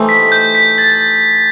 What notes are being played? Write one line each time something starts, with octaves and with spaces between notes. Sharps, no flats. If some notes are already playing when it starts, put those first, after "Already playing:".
Already playing: E3 A3 D#4 G4 C5
B6
G6
B6
A6